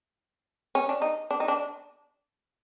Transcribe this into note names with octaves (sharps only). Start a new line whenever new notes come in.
C#4
D4
D#4
D4
D#4
D4